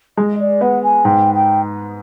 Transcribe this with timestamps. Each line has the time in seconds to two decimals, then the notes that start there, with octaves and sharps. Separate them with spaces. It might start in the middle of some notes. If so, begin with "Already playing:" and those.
0.17 G#3 D#5
0.40 D5
0.61 B3 F#5
0.83 G#5
1.05 G#2 G5
1.34 G5